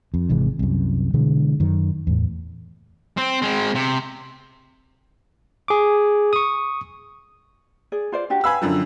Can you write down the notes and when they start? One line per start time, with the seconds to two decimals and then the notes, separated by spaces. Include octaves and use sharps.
0.14 F2
0.29 G#1 C3 E3 G#3
0.59 C2 F#2
1.14 B2 D3 E3 G#3
1.60 F#2 D#3
2.07 E2 A2
3.17 C4
3.42 G#3 C4
3.75 C3
5.68 G#4 D6
6.33 C#6 D#6
7.92 G#4 D5
8.12 F4 C5 D5
8.30 D4 F#4 G4
8.44 B4 F5 G#5 B5 E6
8.62 F#2 D3 F3